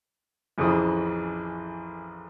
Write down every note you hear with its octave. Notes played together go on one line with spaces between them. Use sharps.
A1 F2 C#3 E3 D#6